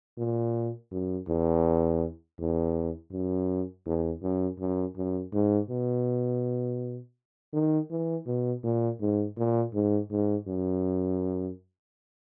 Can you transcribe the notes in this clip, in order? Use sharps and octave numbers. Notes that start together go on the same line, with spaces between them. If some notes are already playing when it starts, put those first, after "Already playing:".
A#2
F#2
E2
E2
F#2
E2
F#2
F#2
F#2
G#2
B2
D#3
E3
B2
A#2
G#2
A#2
G#2
G#2
F#2